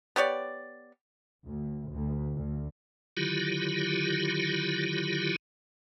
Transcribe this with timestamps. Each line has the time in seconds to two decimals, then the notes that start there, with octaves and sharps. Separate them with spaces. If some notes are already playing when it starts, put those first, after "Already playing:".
0.16 B3 G4 C#5 D5
1.46 D2
1.92 D2
2.34 D2
3.17 D3 D#3 F#3 E4 F4 G4